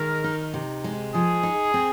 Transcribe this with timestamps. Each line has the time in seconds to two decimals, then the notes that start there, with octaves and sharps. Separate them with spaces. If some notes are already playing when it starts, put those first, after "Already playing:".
Already playing: D#3 G#3 A#4
0.24 D#4
0.54 C3
0.84 G#3
1.14 F3 G#4
1.43 D#4
1.74 C4